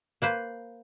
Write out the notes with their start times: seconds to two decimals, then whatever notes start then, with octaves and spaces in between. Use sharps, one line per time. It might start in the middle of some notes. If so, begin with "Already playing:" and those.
0.22 A#3 B4 C5